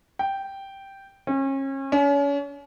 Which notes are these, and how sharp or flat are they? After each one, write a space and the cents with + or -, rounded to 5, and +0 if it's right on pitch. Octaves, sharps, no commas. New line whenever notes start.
G5 -5
C#4 -35
C#4 +35